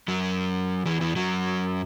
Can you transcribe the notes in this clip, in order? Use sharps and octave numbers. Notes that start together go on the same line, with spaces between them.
F#2 F#3
E2 E3
E2 E3
F#2 F#3